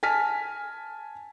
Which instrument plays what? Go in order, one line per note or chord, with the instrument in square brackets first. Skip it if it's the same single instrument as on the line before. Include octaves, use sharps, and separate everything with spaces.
[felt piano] G#5 A5 F6 B6